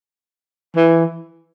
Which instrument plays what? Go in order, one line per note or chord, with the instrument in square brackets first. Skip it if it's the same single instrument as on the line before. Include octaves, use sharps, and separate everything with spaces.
[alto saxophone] E3